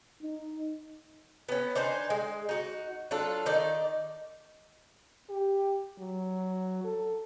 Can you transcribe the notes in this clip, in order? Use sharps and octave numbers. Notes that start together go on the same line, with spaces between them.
D#4
B3 C#4
D4 D#4 C5 G#5
G#3
D#4 F#4
F#3 D4 F4 A4
D#3 D#4 D5
G4
F#3
A4